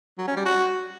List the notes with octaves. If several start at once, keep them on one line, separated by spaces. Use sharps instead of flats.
F#3
C#4
G3
F#4